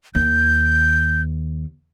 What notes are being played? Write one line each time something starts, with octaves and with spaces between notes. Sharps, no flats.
D#2 G6